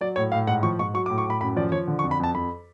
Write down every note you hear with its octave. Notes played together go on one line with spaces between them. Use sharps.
F#3 D5
A2 C#5
A2 F5
G#2 F#5
F3 C#6
G#2 C#6
F#3 C#6
D6
A2
C#6
A2 B5
F#2 B5
F3 D5
F3 C#5
D3
C#6
F2
B5
F2 A5
F2 B5